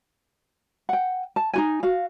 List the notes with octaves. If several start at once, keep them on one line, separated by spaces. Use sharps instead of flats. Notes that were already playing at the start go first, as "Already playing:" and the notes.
F#5 G5
A5
D#4 F#4 G#5
F#4 F5